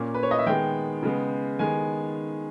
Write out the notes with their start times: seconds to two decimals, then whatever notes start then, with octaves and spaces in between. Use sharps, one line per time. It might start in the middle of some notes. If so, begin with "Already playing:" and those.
Already playing: A#2 A#3 C#4
0.14 B4
0.23 C#5
0.31 D#5
0.38 E5
0.46 D#3 G#3 B3 G5
1.03 C#3 G#3 B3
1.59 D#3 G#3 B3 G#5